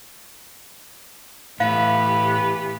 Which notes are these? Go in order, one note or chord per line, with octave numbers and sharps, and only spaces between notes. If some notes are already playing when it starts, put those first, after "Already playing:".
A2 E3 B3 G4 F5